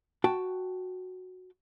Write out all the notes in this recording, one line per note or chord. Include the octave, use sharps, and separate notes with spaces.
F#4 G5 A5